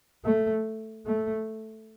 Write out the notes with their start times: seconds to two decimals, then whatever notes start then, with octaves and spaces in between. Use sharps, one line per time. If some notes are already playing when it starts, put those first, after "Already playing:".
0.25 A3
1.06 A3